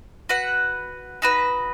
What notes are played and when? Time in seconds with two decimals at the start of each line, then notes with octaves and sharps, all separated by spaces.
0.29 F#4 B4 F#5
1.22 D#4 F#4 B4